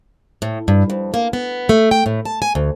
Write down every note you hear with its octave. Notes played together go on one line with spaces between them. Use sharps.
A2
G2
F2
A#3
B3
A3
G5
A2
A5
G#5
D2